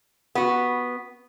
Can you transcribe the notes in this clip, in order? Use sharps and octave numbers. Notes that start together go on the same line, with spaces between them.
B3 F#4